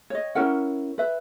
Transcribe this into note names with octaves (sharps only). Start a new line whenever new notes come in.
C#5 D#5
C#4 E4 A#4 F#5
B4 E5